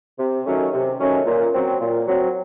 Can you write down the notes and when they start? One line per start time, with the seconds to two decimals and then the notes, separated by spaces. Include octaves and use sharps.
0.19 C3
0.46 D#3 F#3 A3 C#4
0.73 C3
1.00 D#3 F#3 A3 C#4
1.27 A#2
1.54 F#3 C4
1.81 A#2
2.08 F#3 C4